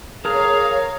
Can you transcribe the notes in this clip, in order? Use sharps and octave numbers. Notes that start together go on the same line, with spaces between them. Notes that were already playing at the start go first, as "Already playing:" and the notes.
G#4 A#4 C#5 F5 A#5 F6